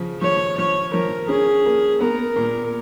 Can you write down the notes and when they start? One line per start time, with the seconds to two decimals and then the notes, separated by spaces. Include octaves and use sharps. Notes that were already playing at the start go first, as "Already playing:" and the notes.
Already playing: C#3 F3
0.21 F3 C#5
0.58 F3 C#5
0.93 F3 A#4
1.29 C#4 G#4
1.65 A#3
2.01 B3 A#4
2.36 A#2